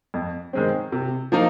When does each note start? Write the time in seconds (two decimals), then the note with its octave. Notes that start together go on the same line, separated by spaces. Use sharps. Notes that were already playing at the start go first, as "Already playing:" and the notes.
0.14 F2
0.53 D#3 G#3 C4
0.92 C3
1.32 F3 A#3 D#4